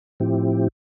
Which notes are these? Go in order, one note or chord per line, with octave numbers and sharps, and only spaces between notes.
A2 F3 C4 E4 G4